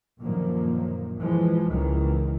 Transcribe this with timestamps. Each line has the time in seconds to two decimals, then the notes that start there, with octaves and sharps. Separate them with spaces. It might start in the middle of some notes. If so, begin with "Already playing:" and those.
0.21 F#2 A#2 D3 D#3 F3 A#3
1.19 E3 F3 G#3
1.70 C#2 D#3 E3